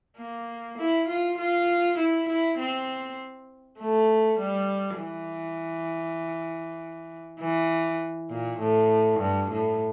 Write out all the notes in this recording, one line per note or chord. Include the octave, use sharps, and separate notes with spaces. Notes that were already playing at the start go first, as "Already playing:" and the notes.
A#3
E4
F4
F4
E4
E4
C4
A3
G3
E3
E3
A#2
A2
G2
A2